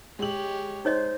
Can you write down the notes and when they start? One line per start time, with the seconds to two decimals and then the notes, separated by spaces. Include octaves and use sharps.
0.19 G#3 G4 C#5 F#7
0.85 D#4 C5 C#5 D#5